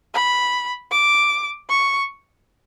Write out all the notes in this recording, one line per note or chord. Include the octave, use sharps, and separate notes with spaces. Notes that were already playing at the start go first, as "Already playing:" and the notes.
B5
D6
C#6